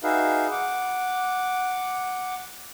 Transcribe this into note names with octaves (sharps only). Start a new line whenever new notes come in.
D#4 F#4 G#4 B4 E5 F5
F#5 D6